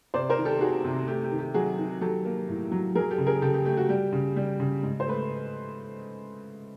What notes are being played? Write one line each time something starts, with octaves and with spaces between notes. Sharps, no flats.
C3 C5 D5
A#4 C5
D#3
G4 A4
D#3 F#4 G#4
C3
A3 G4
G4
D#3
G4
F#3 F#4 G#4
D#3
F#3 G4 A4
A#3
A2
F#3
F#3 G#4 A#4
G4 A4
C#3
G#4 A#4
C#3 G4 A4
G4
A3 G4
F#4
G3 G4
C#3
G3
C#3
G#2
C5
A3 B4